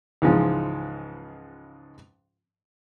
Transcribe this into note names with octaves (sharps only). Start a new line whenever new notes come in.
C#2 G#2 E3 F3 G#3